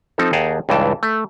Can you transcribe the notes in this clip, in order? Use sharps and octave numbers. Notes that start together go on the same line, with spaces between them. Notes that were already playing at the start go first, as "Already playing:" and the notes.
F3 C4 D#4 A4
D#2 G#4 F#5 G5 A5 A#5
C#2 G2 E3 G5 A5
A3